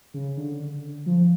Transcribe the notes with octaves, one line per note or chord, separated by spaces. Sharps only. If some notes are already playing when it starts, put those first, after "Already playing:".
C#3
D3
D3
F3